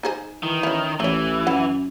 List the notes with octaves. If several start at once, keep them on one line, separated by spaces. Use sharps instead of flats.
D#4 G#4 C5
D#3 E3
C#4 E4
A1 E3 A3 C#5
F#2 E4 F#5